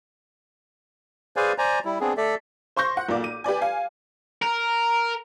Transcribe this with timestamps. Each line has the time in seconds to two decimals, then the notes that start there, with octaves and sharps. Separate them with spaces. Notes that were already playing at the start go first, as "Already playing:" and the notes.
1.36 G#4 B4 C5 D5 F5 G#5
1.58 C5 D5 G#5 A#5
1.85 G3 E4
2.00 B3 C4 D4 G#4
2.17 A3 A4 D5 E5
2.76 C5 C6 C#6 G6 A#6
2.97 F#5
3.08 B1 A#2 A#3 D5 D6
3.24 D#7
3.44 G4 B4 D5 G#5
3.61 F5 G#5
4.42 A#4